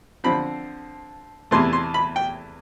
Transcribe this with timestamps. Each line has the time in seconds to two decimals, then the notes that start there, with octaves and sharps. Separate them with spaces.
0.24 D3 F3 C4 B5
1.51 E2 C3 E3 A3 C6
1.73 C6
1.94 B5
2.16 G5